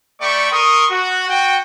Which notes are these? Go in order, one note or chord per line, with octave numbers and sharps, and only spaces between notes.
A3 D5 G5 B5 C#6
A#4 C6 C#6 D#6
F#4
F#4 G5